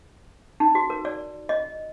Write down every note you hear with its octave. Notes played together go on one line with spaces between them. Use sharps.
D#4
F#4
A#4
D5
D#5